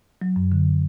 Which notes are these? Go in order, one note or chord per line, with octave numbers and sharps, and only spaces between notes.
F#3
F#2
D3